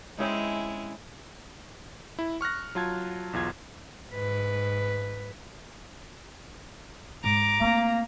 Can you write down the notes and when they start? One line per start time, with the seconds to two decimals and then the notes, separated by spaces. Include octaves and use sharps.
0.18 G#3 C4 C#4 D#4 E4
2.19 E4
2.41 C#6 F6 F#6 A#6
2.75 F#3 F4 A5 G#6
3.33 B1 E2 F4 G#6
4.12 G#2 B4
7.24 G#2 A#5 D6
7.61 A3 A#3 C4